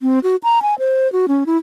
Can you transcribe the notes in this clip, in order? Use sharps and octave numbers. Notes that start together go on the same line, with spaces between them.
C4
F#4
A#5
G#5
C5
F#4
C#4
E4